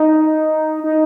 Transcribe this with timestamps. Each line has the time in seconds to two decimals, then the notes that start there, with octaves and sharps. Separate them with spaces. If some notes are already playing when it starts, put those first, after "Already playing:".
Already playing: D#4
0.84 D#4